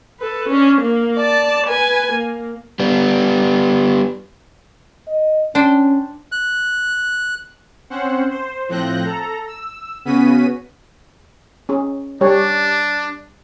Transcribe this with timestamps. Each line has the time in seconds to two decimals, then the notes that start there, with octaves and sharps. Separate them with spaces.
0.20 A4 B4
0.49 C#4 D4
0.82 A#3
1.16 D5 A5
1.67 B4 G#5
2.13 A#3
2.80 G3 B3
5.07 D#5
5.55 C#4 D4 C5 G5
6.32 F#6
7.90 C4 C#4 C5 F#5
8.30 C5
8.68 A2 F3 C4 F#6 G6 A#6
9.04 A4 A#5
9.47 E6
10.05 C#3 B3 C#4 F#4 B6 D#7
11.69 C#4 G#4
12.21 G3 D4 G4 C#5